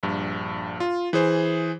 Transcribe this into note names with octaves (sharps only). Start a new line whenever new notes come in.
A#1 G2
F4
E3 G#4 C5